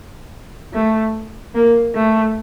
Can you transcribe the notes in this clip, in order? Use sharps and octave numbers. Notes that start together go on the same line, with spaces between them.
A3
A#3
A3